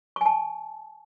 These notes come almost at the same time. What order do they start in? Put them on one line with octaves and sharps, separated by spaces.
C#6 G#5 A5